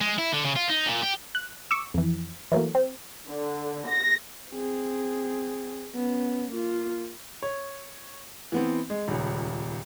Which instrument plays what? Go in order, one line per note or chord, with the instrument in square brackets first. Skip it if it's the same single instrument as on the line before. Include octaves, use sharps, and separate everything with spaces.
[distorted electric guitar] G#3
E4
D3
C#3
F4
D#4
A#2
G4
[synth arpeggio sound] F#6
C#6 D6 E6
F2 E3
E3 F#3 A3 A#3
C4
[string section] D3
A#6
[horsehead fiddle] C4 G#4
B3 C#4
A#3 F4
[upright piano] C#5
E3 B3 C4
G#3
D#1 C#2